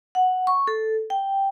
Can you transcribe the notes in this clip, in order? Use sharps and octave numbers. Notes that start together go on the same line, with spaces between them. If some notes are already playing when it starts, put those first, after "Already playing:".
F#5
C#6
A4
G5